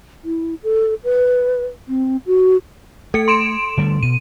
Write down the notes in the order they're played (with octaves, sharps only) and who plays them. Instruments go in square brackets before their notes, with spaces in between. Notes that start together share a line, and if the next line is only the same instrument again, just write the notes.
[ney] E4
A4
B4
C4
F#4
[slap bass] A3 [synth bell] A4 C#7
[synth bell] C6 D7 E7
[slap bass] D3 G3 A3
[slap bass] B2 [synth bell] D#7